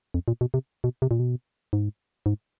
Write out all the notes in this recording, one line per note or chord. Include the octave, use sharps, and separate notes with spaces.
F2
A#2
B2
C3
B2
C3
A#2
B2
G#2
G#2